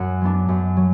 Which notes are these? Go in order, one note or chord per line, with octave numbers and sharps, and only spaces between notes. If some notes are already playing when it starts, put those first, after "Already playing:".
Already playing: F#2 F#5
F#3 B3 D4
F#2
F#3